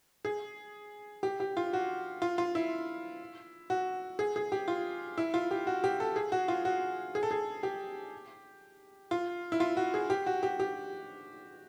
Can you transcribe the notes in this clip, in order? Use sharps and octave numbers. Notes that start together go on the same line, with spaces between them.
G#4
G4
G4
F4
F#4
F4
F4
E4
F#4
G#4
G#4
G4
F4
E4
F4
G4
F#4
G4
A4
G#4
F#4
F4
F#4
G#4
A4
G#4
G4
F4
E4
F4
F#4
G#4
G4
F#4
G4
G4